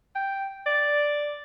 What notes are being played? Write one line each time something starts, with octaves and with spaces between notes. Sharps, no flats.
G5
D5